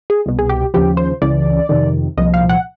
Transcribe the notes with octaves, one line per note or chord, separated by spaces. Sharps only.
G#4
C2 B2
G#4
G4
D#2 C#3 F3 G4
C5
C#2 C#3 E3 D5
F2 C3 D#3
C2 A#2 F3 D#5
F5
F#5